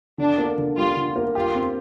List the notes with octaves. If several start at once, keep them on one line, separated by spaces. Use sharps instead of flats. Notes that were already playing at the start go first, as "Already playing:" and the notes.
D3 D4
A#3
D3
G3 F4
D3
A#3
F4 G4
C4